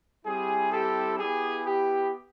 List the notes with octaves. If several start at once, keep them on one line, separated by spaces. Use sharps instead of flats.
G3 C4 E4 G4 G#4
G4 A4
B3 E4 G4 G#4
G4